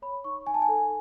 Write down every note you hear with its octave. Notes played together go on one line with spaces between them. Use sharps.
C#5 B5
D#4 C#6
D#4 G#5
A5
G#5
A4